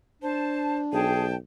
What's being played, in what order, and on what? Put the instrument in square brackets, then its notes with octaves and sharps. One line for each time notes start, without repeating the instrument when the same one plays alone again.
[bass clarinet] D4 [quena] C5 [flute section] A5
[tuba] B1 [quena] G#4 [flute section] G5 A5